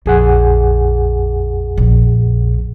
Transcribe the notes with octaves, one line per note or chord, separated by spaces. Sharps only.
A#1 F2 G#4 F#5
A#1